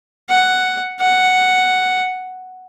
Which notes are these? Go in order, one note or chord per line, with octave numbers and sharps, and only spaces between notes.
F#5
F#5